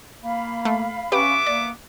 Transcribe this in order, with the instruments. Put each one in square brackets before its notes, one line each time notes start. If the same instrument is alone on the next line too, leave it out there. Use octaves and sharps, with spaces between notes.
[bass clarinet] A#3 [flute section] F5 B5
[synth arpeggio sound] A3
[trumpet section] B3 E5 D6 [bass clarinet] C#4 [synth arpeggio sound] G4 B4
[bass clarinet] A#3 [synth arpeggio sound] D5